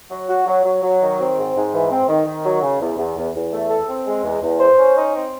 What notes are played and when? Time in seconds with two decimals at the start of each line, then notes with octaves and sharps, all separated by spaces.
0.11 F#3
0.28 F#4
0.47 F#3
0.64 F#3
0.83 F#3
1.01 D#3
1.19 C4
1.37 G#2
1.55 G#2
1.73 E3
1.91 C4
2.09 D#3
2.26 D#3
2.45 F#3
2.62 C#3
2.81 E2
2.98 E2
3.17 E2
3.34 E2
3.53 A3
3.70 A4
3.88 C4
4.07 G#3
4.24 E2
4.42 E2
4.60 C5
4.78 C#4
4.97 D#4
5.14 C4